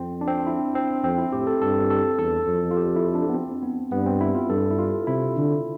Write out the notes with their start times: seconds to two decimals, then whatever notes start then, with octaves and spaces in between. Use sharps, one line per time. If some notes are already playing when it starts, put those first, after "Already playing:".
Already playing: F2 C4
0.21 D4
0.27 C4
0.47 E4
0.75 C4
1.03 F2 C4
1.18 E4
1.32 A2 G4
1.47 A4
1.61 G2 A4
1.90 A4
2.19 E2 A4
2.48 F2
2.71 F4
2.77 G4
2.96 E4
3.15 D4
3.29 B3
3.34 C4
3.63 B3
3.92 G2 B3
4.06 C4
4.21 E4
4.35 F4
4.50 G2 A4
4.71 E4
4.79 F4
5.07 C3 E4
5.36 D3